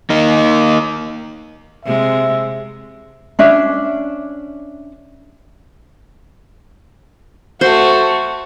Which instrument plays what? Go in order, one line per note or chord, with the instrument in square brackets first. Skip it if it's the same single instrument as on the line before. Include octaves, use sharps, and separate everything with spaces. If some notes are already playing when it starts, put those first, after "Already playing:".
[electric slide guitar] A#3 D#4
[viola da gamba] C3 G#3 [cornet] E5
[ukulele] C#4 D4 E5
[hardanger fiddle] A3 F#4 [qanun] C5